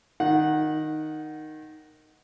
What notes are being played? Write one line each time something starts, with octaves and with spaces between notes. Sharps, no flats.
D#3 F#5